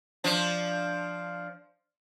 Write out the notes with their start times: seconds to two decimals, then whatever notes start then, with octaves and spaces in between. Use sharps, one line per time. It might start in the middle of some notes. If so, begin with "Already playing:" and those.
0.24 F3 D4